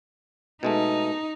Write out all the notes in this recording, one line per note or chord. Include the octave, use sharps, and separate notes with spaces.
B2 G#3 A3 D#4